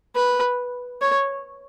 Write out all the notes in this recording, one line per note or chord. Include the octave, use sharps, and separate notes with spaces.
B4
C#5